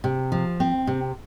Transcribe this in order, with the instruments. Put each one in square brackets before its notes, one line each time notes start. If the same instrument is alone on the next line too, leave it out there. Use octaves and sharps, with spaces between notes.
[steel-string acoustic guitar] C3
F3
C4
C3